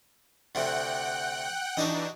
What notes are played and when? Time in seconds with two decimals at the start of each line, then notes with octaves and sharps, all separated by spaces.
0.55 D2 C3 F#5 G5 F#6
1.77 E3 D4 D#4 F#4 G4 D#5